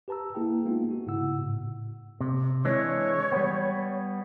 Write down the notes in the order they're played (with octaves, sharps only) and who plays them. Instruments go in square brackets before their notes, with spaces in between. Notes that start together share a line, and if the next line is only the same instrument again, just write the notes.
[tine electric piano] G4 B4 A5 A#5 E6
A#3 E4 G#4 G5
G#3 A#3 B3 D#4 F4
F#4
G#2 C#3 E4 F#5 E6
A2
[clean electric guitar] C3
[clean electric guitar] E3 G#3 D4 [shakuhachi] C#5
[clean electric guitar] G3 B3